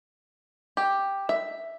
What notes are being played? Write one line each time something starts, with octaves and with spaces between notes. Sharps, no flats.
G4
E5